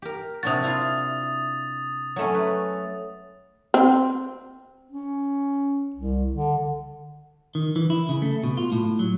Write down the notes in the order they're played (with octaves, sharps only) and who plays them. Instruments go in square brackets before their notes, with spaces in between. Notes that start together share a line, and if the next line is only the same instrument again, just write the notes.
[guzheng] G4 A#4
[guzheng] C3 D4 F#4 [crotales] D#6 A6
[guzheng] E4 F4 F5
F#3 A3 C#4
B4
[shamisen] C4
[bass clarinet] C#4
C2
D3
[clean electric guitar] D#3
E3
E4
C#3
A3
B2
F4
A2
F#3